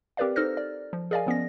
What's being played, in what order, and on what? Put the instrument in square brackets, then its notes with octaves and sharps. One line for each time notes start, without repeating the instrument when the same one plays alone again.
[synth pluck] C4 G4 A#4 B4 D5 F5
D#4 A4 C5 F6 A#6
D5
F3
G#4 A#4 D5 D#5 F5 G#5
F3 B3 C#4 A#6